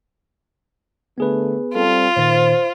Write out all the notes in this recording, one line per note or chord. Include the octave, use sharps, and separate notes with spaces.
D3 A3 B3 G#4 B4
G3 C4 F4 A4
A#2 D#3 C5 A6